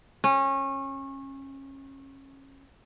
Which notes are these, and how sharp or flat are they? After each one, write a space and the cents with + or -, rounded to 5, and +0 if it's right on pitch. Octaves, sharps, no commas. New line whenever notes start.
C#4 -25